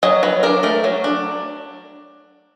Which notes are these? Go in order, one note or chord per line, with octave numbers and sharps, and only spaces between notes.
F#3 D#5
F#3 B4
D4 A#4
A3 A#4
F#3
D4